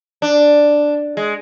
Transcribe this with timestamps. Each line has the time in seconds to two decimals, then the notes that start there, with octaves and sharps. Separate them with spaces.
0.22 D4
1.17 G#3